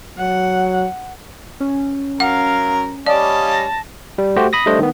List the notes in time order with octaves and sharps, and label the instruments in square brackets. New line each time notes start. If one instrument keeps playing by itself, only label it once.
[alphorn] F#3 [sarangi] F#5
[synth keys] C#4
[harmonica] F#3 A#4 A#5 [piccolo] F5 [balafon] F#5
[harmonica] G3 C#4 D#5 [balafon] D5 [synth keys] F5 D6 [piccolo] A5
[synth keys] A#6
[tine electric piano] G3
A3 F#4 G4 C5
B5 D#6 A#6
G3 A3 D4 C5 D#5
D#3 B3